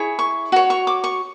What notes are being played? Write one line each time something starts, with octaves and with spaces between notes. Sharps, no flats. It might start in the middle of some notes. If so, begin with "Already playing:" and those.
Already playing: E4 G#4 C#5
C#6
F#4 C#5
C#6
D6
C#6